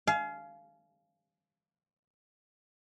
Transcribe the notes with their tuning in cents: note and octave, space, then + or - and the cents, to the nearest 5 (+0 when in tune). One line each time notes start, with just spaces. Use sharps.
F5 -10 G#5 +35